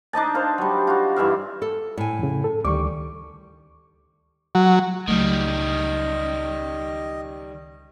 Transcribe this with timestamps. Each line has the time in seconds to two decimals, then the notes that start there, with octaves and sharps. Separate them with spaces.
0.13 D4 D#4 D#5 A5
0.34 C5 F5
0.58 F#3 G3
0.87 F4 F#4
1.16 G2 E3 E5 F5
1.62 A4
1.97 A2 G#5
2.19 F2 C#3
2.44 A4
2.65 D2 D#3 G3 C#6 D6
4.55 F#3
5.08 C#2 D#3 F#3 G3 A3 D#5